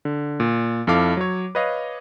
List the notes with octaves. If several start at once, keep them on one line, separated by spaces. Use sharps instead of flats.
D3
A#2
F2 E4 A4 F5 D6
F#3 C#5
B4 C#5 D#5 F5